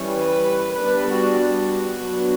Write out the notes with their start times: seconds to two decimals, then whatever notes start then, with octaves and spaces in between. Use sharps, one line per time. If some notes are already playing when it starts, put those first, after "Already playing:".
Already playing: E3 G3 C#4
0.16 B4
0.77 G3 B3 D4 B4
1.08 F#4
1.39 F#4
1.99 F#3 B3 D4